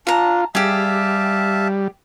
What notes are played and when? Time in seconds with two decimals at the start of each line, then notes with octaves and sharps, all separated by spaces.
0.07 D4 F4 A5 A#5
0.55 G3 G4 G#4 E5 F5 A5